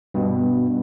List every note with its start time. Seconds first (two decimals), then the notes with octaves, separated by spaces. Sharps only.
0.14 G2 B2